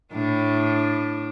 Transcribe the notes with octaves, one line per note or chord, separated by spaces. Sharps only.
A2 D4